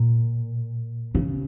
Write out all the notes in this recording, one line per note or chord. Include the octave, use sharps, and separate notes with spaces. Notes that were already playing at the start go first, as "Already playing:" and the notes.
Already playing: A#2
C#3